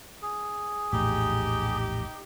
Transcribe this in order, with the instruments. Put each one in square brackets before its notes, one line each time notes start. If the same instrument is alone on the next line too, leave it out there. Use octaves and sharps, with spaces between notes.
[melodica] G#4
[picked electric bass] A#1 E2 A2 [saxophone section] D#4 G4